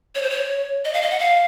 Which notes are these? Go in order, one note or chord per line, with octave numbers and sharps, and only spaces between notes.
C#5
C5
C#5
D#5
F5
D#5
F#5
F5